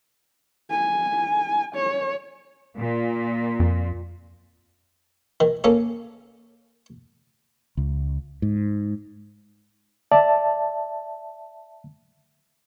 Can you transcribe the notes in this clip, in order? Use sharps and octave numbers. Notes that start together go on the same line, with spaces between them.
G#5
C#5
A#2
F2
D#3
A#3 C#4 A4
C#2
G#2
D5 E5 A5